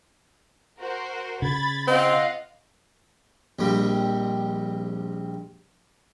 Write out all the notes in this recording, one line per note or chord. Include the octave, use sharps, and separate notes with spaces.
F#4 A#4 C5
C#3 B5 G#6 A6
C4 F4 D#5 F5 F#5
A#1 F2 G3